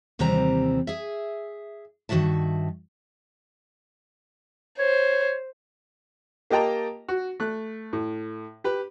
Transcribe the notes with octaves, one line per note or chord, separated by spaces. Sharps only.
D#2 C3 E3 G3 C4 A#5
G#4 E5
G2 D#3 F3 F#4 E5 A5
C5 C#5
A#3 G4 D#5 G5 A5 A#5
F#4
A3 F#6
A2
G4 B4